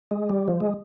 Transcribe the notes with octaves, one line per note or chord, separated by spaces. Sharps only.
G#3
G3
F3
G#3